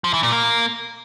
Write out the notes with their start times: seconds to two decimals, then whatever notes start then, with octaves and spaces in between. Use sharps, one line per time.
0.04 F3
0.14 E3
0.23 A#2
0.32 A#3